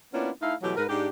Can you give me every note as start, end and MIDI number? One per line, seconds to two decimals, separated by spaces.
0.12 0.30 58
0.12 0.30 59
0.12 0.30 61
0.12 0.30 62
0.12 0.30 64
0.12 0.30 65
0.41 0.54 57
0.41 0.54 63
0.41 0.54 64
0.41 0.54 77
0.63 0.73 47
0.63 0.73 52
0.63 0.73 54
0.63 0.73 57
0.63 0.73 67
0.77 0.84 44
0.77 0.84 70
0.77 0.84 71
0.88 1.08 44
0.88 1.08 62
0.88 1.08 67